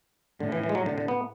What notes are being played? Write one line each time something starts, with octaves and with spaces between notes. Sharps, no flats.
A2 D3
E3
E3
G#3
F#3
D3
D3
B3